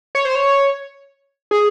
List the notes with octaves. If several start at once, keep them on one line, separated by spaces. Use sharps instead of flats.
C#5
C5
C#5
G#4